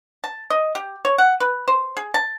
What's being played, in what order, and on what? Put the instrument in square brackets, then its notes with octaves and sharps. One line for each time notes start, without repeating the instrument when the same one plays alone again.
[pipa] A5
D#5
G4
C#5
F#5
B4
C5
G#4
A5